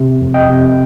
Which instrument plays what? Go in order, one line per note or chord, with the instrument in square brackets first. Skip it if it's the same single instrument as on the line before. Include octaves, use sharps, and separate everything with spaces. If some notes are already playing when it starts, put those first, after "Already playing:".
Already playing: [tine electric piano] C3
F2
D#5 G5
C3